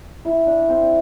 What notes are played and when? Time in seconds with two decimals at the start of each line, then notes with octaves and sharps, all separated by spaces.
0.25 E4
0.46 D4
0.68 C4